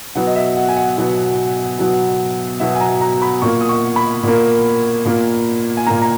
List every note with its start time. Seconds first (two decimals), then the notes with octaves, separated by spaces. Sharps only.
0.15 B2 F#3 B3 F#5
0.27 D#5
0.35 E5
0.57 F#5
0.68 G#5
0.77 F#5
0.97 B2 F#3 B3
1.79 B2 F#3 B3
2.60 B2 F#3 B3 E5
2.75 G#5
2.80 A#5
3.01 A#5
3.22 B5
3.42 A#2 A#3 C#6
3.61 D#6
3.69 C#6
3.96 B5
4.23 A#2 A#3
5.05 A#2 A#3
5.77 G#5
5.87 A#2 A#3 A#5
6.02 A#5